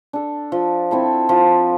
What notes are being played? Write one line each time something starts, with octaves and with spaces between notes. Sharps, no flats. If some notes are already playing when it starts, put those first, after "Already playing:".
D4 A4
F3
C4 E4 A4
F3